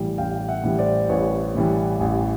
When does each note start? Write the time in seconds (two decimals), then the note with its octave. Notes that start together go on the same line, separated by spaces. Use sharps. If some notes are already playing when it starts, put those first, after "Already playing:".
Already playing: A1 A2 E3 G3
0.18 A1 F5 G5
0.48 E5 F#5
0.63 A2 E3 G3
0.79 C5 D5
1.09 A1 B4 C#5
1.54 A2 E3 G3
2.00 A1